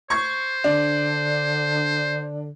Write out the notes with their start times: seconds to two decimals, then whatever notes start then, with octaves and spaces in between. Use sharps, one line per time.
0.10 C5 C#6 G#6
0.64 D3 D4